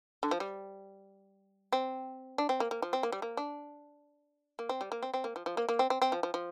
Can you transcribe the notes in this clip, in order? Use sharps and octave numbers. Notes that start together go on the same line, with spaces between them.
D3
F3
G3
C4
D4
C4
A#3
A#3
F3
C4
A#3
G3
A#3
D4
A#3
C4
G3
A#3
C4
C4
A#3
F3
F3
A#3
A#3
C4
C4
C4
F3
F3
F3